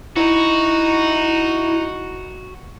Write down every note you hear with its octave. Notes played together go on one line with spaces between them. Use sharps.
D#4 E4 F#4